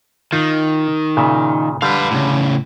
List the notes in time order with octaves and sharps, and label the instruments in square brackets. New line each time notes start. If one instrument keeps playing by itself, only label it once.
[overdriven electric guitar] D#3 [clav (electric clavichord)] D#4 F4
[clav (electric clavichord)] A#2 C#3 E5
[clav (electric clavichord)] D3 G3 [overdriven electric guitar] B4 F5
[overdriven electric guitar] A2 C#3